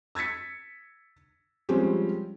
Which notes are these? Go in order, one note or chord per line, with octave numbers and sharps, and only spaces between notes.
E6 G#6 A6 B6 C#7
F3 G3 G#3 C4 C#4 G4